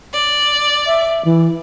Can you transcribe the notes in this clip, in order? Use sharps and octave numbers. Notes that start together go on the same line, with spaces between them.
D5
E5
E3